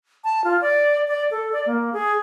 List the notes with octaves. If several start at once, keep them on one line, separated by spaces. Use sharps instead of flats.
A5
F4
D5
D5
A4
D5
A#3
G#4